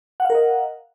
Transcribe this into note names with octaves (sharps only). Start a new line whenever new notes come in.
A#4 D#5 F5 F#5